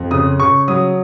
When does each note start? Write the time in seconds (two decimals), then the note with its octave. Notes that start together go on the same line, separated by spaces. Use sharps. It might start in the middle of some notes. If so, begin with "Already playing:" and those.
Already playing: F2
0.11 C#3 D#6
0.40 C#3 C#6
0.68 F#3 D#6